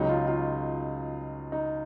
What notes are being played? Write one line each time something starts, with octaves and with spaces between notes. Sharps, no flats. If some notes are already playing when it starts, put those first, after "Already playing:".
Already playing: C#2 C#3 F#3 D#4
F4
F4
D#4